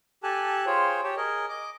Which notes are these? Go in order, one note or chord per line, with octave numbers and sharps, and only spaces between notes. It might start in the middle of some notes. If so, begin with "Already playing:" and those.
G4 A4 G#5 A5 F#6
F4 G#4 C5 C#5 G5
G4 C#5 G5 A5
G#4 A#4 D#5
D#5 D6